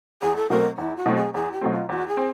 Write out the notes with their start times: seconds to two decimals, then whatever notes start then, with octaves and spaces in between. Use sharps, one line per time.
0.22 E2 G#4
0.36 A4
0.50 B2 F#3 A3 C4 A#4
0.77 E2 E4
0.96 F#4
1.06 B2 F#3 A3 C4
1.16 G#4
1.34 E2 G#4
1.52 G4
1.61 B2 F#3 A3 C4
1.71 F4
1.89 E2 F#4
2.08 G#4
2.17 C4